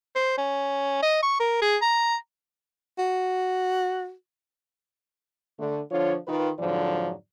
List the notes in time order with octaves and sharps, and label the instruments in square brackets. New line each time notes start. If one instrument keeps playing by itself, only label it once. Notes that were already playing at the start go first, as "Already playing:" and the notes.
[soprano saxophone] C5
C#4
D#5
C#6
A#4
G#4
A#5
F#4
[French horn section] D3 A3
D3 F3 D4 F4 C#5
D#3 F4 B4
F2 G#2 D3 F3 F#3 D5